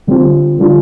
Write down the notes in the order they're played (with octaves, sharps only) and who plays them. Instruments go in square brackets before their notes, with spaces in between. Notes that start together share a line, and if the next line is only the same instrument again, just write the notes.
[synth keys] D3 G3 C4 F4
D3 G3 D4 F4